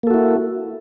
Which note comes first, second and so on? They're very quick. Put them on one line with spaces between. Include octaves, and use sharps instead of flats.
A#3 A4 F#4 E4